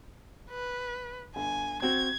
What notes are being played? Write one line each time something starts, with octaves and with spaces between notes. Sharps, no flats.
B4
G1 G#5
C4 F#4 G#6